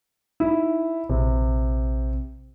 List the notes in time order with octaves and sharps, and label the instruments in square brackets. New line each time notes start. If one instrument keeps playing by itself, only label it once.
[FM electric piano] D#4 [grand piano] E4
[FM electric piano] A#1 [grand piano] C3